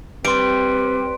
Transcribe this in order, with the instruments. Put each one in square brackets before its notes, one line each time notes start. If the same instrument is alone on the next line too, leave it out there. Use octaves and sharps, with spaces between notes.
[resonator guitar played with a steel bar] G3 [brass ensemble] C4 G4 [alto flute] B4 [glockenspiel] C6 D7